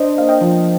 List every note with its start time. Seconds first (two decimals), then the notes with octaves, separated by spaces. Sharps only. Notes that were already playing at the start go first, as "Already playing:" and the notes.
Already playing: D4 C5 D#5
0.17 A#3 F5
0.29 D#5 G5
0.41 F3